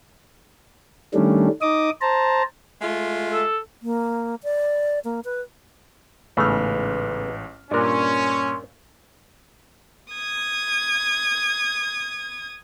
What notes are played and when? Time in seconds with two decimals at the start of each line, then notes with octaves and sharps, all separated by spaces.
1.14 D#3 G3 A3 C#4 D4
1.62 D#4 D#5 D6 D#6
2.01 C5 A5 A#5
2.81 G#3 A3 F4
3.33 A4
3.82 A#3
4.43 D5
5.04 A#3
5.25 B4
6.37 A1 G#2 C#3 A3 B3 B4 F6
7.71 G2 A#2 C#4 D4 A#4 C6
10.13 D#6 G#6